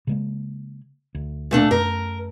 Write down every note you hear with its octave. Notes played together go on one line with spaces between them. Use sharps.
C#3 G#3 A#3
D2
A#2 A3 D4
F#2 A#4